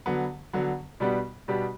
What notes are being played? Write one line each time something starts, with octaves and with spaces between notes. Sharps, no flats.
D3 F#3 B3
D3 F#3 B3
B2 G3 B3 D4 G4
B2 G3 B3 D4 G4